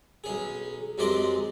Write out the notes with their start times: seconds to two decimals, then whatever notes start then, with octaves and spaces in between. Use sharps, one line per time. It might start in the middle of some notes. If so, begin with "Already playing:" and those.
0.24 B1 C#4 G#4
0.98 F#2 C3 G#3 D5 D#5 C6